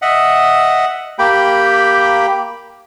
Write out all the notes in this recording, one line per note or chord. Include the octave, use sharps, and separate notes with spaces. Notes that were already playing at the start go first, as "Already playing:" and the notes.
D#5 E5 F#5
A#3 G4 G5 B5